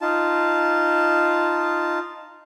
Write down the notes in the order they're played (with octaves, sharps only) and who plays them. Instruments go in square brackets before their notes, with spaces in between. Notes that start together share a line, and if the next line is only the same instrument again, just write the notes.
[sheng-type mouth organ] D#4 F4 A5